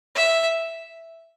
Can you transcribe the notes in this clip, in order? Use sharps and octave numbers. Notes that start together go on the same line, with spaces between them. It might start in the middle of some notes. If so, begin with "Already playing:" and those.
E5